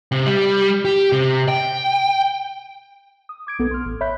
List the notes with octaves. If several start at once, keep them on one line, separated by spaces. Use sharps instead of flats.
C3
G3
G4
C3
G5
D#6
D6 G#6 D7
B1 B3 A4
C6 F6
A1
C#5 E5 B5 F#6 G6 B6